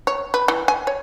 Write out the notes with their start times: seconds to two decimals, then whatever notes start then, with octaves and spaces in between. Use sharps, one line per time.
0.07 C#5
0.34 B4
0.48 E3
0.68 G#5
0.87 C#5